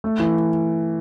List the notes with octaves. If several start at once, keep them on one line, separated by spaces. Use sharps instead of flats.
A3
E3